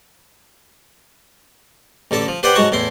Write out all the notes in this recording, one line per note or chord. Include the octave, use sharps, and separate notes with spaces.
A1 D3 A4 A5
F3
G4 B4 C5 D5 F#5 G5
G#2 F#3 G#3 F#4 A5 C#6
E2 A2 E4 C6